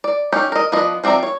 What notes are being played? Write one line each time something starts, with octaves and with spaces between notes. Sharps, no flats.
D5
C#4 D#4 F#4 G4
A#4 D#5
F3 B3 D4 D#5
F3 C4 D5 E5 A#5
C#5